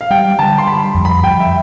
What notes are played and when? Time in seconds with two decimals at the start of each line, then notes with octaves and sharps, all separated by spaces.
0.01 F5
0.11 G3 G5
0.39 D3 A5
0.58 C6
0.67 G3 B5
0.95 F2
1.05 B5
1.24 F2 G5
1.40 E5